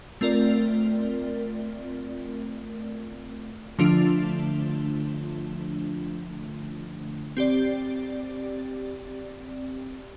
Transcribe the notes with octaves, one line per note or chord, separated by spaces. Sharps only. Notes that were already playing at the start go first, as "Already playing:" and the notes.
A3 C4 F4 A#4 D5
D3 F3 A3 D4 F4
C4 G4 D5